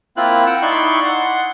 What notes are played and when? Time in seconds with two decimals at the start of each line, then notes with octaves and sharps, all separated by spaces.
0.17 A#3 C4 E4 F4 F#6
0.47 F#5 G5 E6
0.62 D#4 E4 D5 C6 C#6 F#6
1.05 F#5 C6